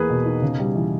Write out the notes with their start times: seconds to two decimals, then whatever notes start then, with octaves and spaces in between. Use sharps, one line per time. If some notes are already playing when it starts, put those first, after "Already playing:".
Already playing: E2 A#3 G#4 B4
0.10 B2
0.25 D#4
0.42 C#3
0.59 G3
0.75 E3